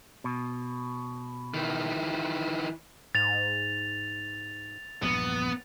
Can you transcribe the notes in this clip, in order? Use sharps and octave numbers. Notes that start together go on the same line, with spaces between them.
B2
D#3 E3
G#2 A6 F7
A#1 E2 G2 B3